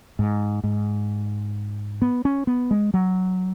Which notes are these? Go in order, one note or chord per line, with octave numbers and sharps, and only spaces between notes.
G#2
G#2
B3
C#4
B3
G#3
F#3